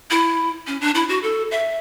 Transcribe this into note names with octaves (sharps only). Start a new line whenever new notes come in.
E4
C#4
D4
E4
F#4
A4
E5